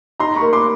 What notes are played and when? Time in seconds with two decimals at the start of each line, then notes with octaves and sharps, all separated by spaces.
0.20 D#4 A#5 C6
0.36 B5 C#6
0.41 A#3
0.53 C6 D6